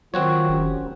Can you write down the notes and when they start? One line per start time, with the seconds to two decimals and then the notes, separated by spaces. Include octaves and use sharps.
0.14 D#3 F#3 C4 F4 F#4 C#5
0.49 F#1 C#4 G4